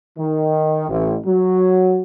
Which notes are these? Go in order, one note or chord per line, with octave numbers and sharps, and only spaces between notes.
D#3
A1
F#3